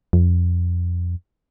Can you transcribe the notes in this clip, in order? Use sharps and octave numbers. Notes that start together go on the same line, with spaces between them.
F2